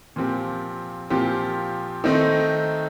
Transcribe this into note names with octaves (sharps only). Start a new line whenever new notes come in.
A#2 F3 C4 G4
A#2 F3 C4 G4
D#3 A3 C4 D#4